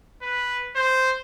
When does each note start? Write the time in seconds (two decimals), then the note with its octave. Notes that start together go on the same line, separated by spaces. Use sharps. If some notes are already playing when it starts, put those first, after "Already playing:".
0.22 B4
0.76 C5